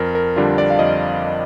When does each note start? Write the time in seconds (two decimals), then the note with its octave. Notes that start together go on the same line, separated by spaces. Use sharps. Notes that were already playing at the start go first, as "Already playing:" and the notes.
Already playing: F2 A#4
0.15 A#4
0.36 D3 G3 D4 F4
0.58 D5
0.70 F5
0.79 F2 D#5